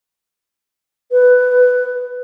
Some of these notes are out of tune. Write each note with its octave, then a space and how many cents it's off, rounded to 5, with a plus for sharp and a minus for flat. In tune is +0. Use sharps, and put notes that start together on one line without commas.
B4 +10